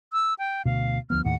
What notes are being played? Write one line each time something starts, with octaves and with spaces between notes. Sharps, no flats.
E6
G5
D2 B2 F5
D2 F3 B3 F6
D#2 A2 F#5